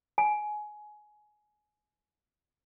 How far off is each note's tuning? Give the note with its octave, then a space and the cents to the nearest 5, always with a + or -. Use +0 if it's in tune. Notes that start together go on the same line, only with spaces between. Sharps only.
G#5 +20